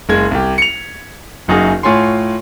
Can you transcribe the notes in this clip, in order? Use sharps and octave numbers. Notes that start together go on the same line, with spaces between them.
F#1 G#3 G#6
C2 G4
C#7 F7
F#1 F#2 D#4 F#4 G#4
A2 F4 C#5 G#5 C6